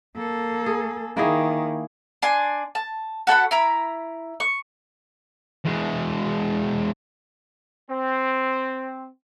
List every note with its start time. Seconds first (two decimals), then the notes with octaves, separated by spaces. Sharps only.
0.16 A#3 A4
0.66 G#4
1.17 D#3 A#3 E4 G#4
2.22 D4 G#5 C6
2.75 A5
3.27 F#4 A4 F#5 B5
3.51 E4 A#5 B5
4.40 C#6
5.65 E2 G#3
7.89 C4